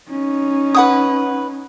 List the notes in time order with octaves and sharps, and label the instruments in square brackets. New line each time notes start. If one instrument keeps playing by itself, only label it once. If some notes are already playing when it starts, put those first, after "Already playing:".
[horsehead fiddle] C#4 D#4
[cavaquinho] B4 F#5 D#6